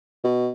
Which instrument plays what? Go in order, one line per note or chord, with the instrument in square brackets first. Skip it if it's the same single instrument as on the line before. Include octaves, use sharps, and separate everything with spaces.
[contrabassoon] B2